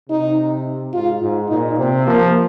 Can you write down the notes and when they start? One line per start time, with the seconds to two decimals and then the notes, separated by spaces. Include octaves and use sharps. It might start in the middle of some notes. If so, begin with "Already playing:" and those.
0.09 C3 D#4
0.94 G#2 F4
1.22 G#2
1.49 A#2 D#4
1.77 C3 C4
2.07 F3 A#3